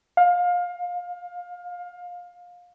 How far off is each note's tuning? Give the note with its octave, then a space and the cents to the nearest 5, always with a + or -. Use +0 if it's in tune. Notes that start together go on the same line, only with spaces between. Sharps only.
F5 +25